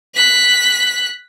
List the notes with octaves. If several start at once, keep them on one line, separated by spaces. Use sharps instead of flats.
F#6 B6